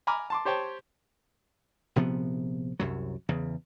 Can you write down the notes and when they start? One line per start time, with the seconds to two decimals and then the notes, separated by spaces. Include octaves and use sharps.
0.07 G#5 A#5 B5 D6 F6
0.30 A5 C6 D6
0.45 G4 C5 C#5 G5 A5
1.96 A#1 C3 F3 B3
2.79 C2 F#2 F#3
3.29 E2 C#3